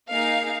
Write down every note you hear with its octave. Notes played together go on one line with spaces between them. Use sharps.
A#3 D#4 G#4 F5